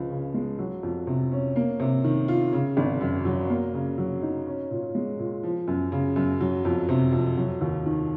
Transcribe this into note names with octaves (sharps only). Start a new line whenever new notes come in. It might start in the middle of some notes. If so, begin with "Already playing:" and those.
Already playing: C#2 F3
C#3
G#3
F#3
F2
C3
C#4
A#3
C3
D#3
F4
C#3
G#1
F#2
F#3
A#3
C#3
F#3
D#4
C#4
A#2
G#3
A#2
F3
F#2
C#3
F#2
F#3
F2
C3
F2
F#3
D#2
D#3